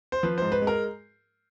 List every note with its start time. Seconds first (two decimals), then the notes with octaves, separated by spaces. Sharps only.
0.12 C5
0.23 F3 B4
0.38 G#2 C5
0.52 B4
0.62 G#3
0.67 A#4